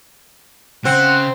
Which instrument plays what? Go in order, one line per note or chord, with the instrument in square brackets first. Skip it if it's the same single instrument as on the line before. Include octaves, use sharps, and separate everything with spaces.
[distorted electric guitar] C#3 [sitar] C4 [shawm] F#5